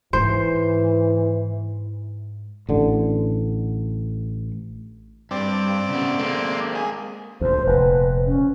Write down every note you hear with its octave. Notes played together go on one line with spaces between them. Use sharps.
G#2 E3 C5
A1 D3
G2 C4 D5
C#3 B3
G#3 A#3
G#4
D2 A#2 C5
F1 A#2 B4
C#4